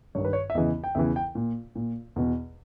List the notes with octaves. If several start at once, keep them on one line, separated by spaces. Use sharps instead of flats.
G2 D#3 C#5
B4
C#5
E5
E2 C#3 E3 D#5
G5
E2 C#3 E3 E5
G5
A#2
A#2
E2 B2